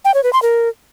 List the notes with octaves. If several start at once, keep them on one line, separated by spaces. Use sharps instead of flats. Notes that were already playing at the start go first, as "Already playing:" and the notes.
G5
C#5
B4
C6
A#4